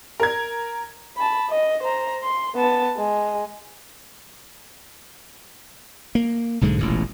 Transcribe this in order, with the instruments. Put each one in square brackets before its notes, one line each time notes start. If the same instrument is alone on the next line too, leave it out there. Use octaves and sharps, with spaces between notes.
[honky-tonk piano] A#4 G#6
[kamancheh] A5 B5
D#5
C5 A#5
C6
B3 A5
G#3
[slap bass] A#3
B1 G#2 D3 G#3
E1 A1 A#2